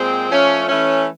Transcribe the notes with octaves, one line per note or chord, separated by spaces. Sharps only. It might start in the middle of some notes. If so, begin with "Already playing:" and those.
Already playing: A#2 G#3 C4
F3 A3 C#4
E3 A3 C#4